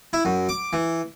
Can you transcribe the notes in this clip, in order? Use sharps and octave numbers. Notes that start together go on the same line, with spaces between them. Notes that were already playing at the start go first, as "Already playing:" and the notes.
E4
F#2
D6
E3